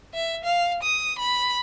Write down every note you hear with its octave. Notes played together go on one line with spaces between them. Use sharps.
E5
F5
D#6
B5